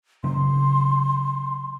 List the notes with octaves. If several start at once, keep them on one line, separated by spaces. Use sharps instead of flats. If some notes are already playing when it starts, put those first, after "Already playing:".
C#3 F#3 C6